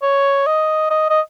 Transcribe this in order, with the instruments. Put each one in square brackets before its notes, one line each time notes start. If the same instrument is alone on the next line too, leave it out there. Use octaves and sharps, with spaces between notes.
[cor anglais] C#5
D#5
D#5
D#5